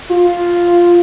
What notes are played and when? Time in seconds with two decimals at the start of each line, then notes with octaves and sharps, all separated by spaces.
0.12 F4